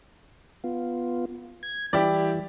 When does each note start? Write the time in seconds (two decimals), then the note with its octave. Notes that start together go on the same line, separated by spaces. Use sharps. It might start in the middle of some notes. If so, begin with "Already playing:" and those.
0.64 B3 F4
1.63 G#6
1.93 E3 G3 E4 G4 D5